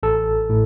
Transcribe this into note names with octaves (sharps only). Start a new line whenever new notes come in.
A1 A4
A2